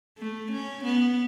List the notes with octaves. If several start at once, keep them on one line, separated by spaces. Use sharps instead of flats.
A3
C#4
B3